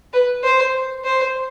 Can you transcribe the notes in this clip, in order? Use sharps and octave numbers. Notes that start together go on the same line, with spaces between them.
B4
C5
C5